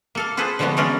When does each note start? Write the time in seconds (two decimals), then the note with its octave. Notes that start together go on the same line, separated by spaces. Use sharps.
0.15 A#3 A4 F5
0.37 F4 G#4 A4 B4 C5
0.59 D3 F3 G3 G#3 B3 F#4
0.77 E3 G#3 B3 C#4 A#4 D5